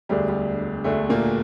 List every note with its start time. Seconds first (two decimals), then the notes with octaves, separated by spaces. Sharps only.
0.09 E1 D2 D3 G3
0.28 G3
0.84 E1 D2 D3 A3
1.09 A#2 A#3